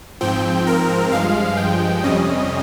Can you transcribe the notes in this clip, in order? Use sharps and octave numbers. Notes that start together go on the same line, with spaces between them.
G#2 F3 C4 G5
A#4
G2 F3 G#3 F5
G5
F2 C3 G3 C#4 D#5